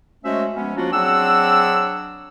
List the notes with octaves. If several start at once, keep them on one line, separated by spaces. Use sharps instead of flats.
G#3 A3 C#4 F#4 C5 E5
F3 G#3 B3 C#4
F3 A#3 C#4 D4 F4 F#4
F#3 C4 D4 G#4 F#5 E6